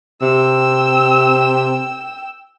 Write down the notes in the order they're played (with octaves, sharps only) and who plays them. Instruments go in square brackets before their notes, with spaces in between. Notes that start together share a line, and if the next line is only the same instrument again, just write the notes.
[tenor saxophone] C3 [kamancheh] G5 E6